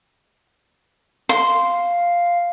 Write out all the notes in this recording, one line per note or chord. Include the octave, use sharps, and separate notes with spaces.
F5 C6